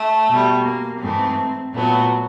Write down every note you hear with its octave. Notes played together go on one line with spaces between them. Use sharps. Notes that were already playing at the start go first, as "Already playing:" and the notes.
Already playing: A3
B2
G3
A#3
G#2 E3 A3 C4
A#2 F#3 A3 B3